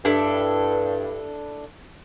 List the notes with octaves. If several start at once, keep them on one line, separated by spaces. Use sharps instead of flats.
G2 D4 E4 A4